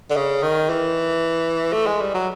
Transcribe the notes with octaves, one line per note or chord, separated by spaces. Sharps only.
D3
C#3
D#3
E3
A3
G#3
G3
F#3